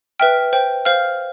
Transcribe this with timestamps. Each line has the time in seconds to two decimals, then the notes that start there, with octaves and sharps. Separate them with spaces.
0.20 B4 E5 G5 F6
0.53 C5 G5
0.85 C5 F5 F6